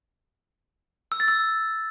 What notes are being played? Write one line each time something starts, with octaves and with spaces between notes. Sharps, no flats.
E6
A6
E6